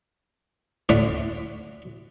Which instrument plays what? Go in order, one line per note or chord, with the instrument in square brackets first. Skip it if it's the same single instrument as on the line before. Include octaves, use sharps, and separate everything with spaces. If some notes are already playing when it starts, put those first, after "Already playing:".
[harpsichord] D2 A2 A3 C#4 D4 F#5